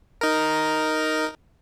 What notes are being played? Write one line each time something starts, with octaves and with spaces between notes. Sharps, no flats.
D#4 A#4